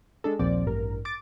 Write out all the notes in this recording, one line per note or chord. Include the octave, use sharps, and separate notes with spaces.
G#3 D4 A4
A#1 D#2 A#2 F3 C4 D5
A1 G2 A#4
D6 A6